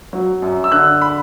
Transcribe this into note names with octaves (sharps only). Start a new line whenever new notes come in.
F#3
F#2
E6
D3 F#6
B5